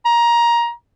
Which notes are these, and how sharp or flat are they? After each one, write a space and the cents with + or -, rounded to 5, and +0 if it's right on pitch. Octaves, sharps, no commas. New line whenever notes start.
A#5 +15